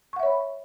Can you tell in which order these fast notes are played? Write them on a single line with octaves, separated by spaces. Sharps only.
C#6 F#5 E5 C#5 B5